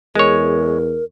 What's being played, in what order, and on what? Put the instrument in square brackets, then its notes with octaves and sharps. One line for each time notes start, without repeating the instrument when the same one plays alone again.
[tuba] E2 [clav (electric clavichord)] G#3 C#5 [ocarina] A#4